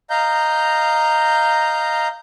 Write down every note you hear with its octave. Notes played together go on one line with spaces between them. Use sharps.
D#5 F5 A#5 G6